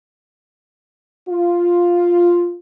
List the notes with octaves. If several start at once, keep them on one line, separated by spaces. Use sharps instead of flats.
F4